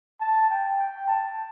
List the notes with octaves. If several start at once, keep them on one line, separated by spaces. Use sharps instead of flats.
A5
G5
G5
A5